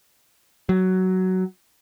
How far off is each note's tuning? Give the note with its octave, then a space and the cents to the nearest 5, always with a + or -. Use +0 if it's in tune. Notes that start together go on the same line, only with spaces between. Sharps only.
F#3 +10